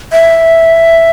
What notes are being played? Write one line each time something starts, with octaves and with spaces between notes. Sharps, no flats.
E5